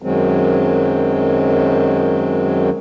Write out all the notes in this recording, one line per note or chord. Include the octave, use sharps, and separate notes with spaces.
F#2 D#3 F#3 G#3 C4